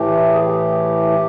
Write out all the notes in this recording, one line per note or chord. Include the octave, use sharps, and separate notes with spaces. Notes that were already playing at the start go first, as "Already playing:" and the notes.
Already playing: A2 E3 A3 G4
G#4
G4